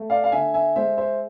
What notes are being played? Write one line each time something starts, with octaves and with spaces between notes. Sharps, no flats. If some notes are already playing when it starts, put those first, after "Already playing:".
Already playing: A3
D5 F5
F5
D3 E5 G#5
E5 G#5
G#3 C5 E5
C5 E5